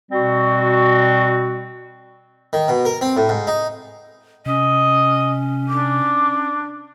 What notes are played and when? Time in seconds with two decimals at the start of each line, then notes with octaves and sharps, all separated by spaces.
0.12 B2 G3 C4 F#4
2.53 D#3
2.68 B2
2.85 A#4
3.01 C4
3.17 A2
3.29 G#2
3.47 D#4
4.46 C3 C#4 D#5
5.68 D4 D6